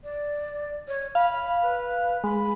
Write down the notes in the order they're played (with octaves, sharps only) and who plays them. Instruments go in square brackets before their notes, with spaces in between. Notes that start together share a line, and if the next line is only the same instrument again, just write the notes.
[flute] D5
C#5
[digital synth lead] F5 [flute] B5
[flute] B4
[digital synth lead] G#3 [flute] B5